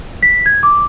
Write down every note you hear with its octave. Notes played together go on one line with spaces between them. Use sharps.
B6
G#6
D6